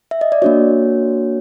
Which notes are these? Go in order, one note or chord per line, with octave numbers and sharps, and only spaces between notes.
E5
D#5
D5
A#3 D4 F#4 C#5